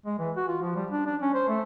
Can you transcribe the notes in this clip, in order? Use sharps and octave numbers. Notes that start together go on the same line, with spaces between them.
G#3
E3
F#4
F4
F3
G3
D4
D4
C#4
C5
A3